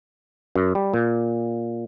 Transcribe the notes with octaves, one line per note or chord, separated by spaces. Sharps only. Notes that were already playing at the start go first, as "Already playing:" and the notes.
F#2
G3
A#2